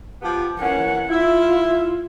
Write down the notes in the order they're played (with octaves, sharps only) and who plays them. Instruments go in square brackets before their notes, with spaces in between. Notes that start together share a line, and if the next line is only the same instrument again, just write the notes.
[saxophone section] F3 B3 G4
[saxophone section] E3 A#3 C#4 [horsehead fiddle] F#5
[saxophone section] E4 [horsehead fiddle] F4